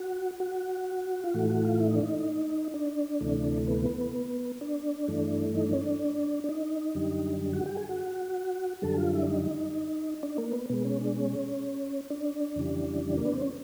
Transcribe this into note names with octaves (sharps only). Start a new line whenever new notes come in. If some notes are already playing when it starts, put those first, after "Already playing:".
Already playing: F#4
F#4
F4
A2 E3 A3 F#4
F#4
F4
E4
D#4
D4
D#4
D4
D2 C3 E3 A3
B3
D4
G2 E3 A3
D#4
D4
C#4
D4
D4
D#4
F#2 D3 G3
F#4
G4
G#4
F#4
F#2 D3 G3 A4
F4
E4
D4
D#4
D4
A#3
B3
B2 G#3 B3
C#4
D4
C#4
D4
F2 C#3 E3 G3
A#3
B3
C4
C#4